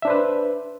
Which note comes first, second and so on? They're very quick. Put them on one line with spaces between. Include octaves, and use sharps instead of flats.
E5 D4 C5 B4